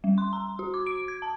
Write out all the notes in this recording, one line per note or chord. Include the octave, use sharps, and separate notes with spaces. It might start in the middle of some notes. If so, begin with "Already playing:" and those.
G3
C6
A#5
F#4
D6
D7
G#6
A5